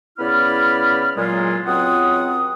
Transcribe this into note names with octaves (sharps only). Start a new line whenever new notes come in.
C#3 B3 E4 D5 B5 F6
A#2 F#3 G#3 F4
C#2 F#3 C4 F4 F#5 D#6